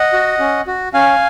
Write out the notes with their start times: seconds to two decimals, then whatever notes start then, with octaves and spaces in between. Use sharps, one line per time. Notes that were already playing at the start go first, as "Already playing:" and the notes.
Already playing: D#5 F#5
0.13 F#4
0.39 C#4
0.67 F#4
0.94 C#4 F5 G#5